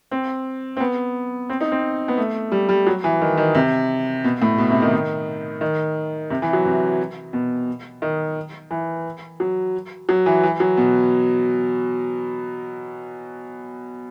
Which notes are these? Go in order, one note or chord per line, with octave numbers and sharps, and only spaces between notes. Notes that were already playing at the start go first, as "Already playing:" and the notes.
C4
C4
B3
C4
D#4
C4
B3
A3
G3
G3
F#3
E3
D#3
D#3
C3
B2
A2
B2
C3
D#3
D#3
C3
E3
F#3
C3
B2
D#3
E3
F#3
F#3
E3
E3
F#3
B2